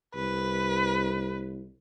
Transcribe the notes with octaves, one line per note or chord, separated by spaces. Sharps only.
C2 B4